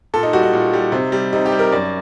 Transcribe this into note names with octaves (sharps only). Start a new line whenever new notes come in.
A#2 A4
D#4
G3 F#4
D#4
A#2
G3
C3
G3
C3 D#4
G4
G3
A#4
F#2 D5